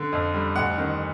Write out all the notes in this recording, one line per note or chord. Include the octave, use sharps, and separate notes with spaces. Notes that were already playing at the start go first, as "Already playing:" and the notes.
Already playing: D3
F2
G3
D2 F#5
D#3